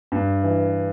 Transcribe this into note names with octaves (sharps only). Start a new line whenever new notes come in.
G2
E3